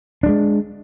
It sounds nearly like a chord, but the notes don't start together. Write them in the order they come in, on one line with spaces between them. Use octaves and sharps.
D4 G3 G#3